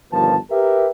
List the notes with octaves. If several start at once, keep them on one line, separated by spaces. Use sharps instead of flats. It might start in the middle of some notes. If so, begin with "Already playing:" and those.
G1 D#2 A#2 F3 B4 A5
G4 A#4 B4 E5